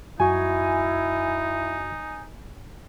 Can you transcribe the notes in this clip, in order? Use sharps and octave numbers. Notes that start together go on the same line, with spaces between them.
F#2 D#4 E4 F#4 G#5 C#6